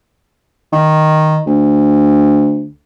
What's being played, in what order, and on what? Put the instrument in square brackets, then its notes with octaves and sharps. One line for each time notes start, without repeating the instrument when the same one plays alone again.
[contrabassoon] D#3
D2